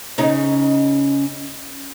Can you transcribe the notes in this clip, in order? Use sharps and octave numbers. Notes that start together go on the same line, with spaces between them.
C#3 C#4 D#4